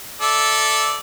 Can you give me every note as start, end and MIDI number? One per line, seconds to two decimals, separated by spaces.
0.21 0.98 69
0.21 0.98 74
0.21 0.98 76